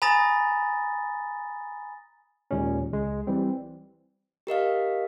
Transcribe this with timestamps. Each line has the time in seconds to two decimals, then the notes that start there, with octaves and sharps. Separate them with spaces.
0.02 G#5 A#5 B5 D#6 A6 A#6
2.51 D#2 A#2 G#3 C#4
2.92 C#2 G#3
3.27 E3 G3 C4
4.47 G4 A#4 D#5 F5